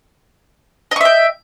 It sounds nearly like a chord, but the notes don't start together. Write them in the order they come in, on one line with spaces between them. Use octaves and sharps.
D#5 C#6 E5 G5